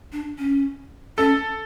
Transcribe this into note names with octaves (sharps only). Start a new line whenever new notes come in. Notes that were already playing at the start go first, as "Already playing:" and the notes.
D4
C#4
C#4 A4